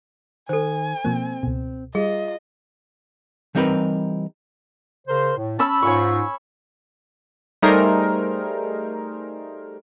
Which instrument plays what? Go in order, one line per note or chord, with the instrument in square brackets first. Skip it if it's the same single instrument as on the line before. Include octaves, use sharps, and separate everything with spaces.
[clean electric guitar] D#3 [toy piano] A4 C5 [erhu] G#5
[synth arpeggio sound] B2 F3 A#3 [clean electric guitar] C4
[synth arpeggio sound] C#2 B2
[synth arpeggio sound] G3 [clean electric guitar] F4 [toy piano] G#4 [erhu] D#5
[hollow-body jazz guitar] E3 G3 C4 D#4 A#4 B4
[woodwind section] C#3 A#4 C5
A2
[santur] C#4 B5 E6 [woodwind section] A5
[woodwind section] G#2 F4 [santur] C#5 G#5 C#6
[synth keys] G3 A3 D#4 G#4 A#4 C5